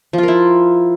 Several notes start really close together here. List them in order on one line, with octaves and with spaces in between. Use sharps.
F3 F4 A#4 E4